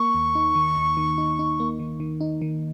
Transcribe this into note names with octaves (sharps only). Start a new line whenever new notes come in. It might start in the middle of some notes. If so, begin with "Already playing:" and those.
Already playing: A#3 C#6
D#2
D#4
D#3
D#2
D#3
D#4
D#4
A#3
D#3
D#3
D#4
D#3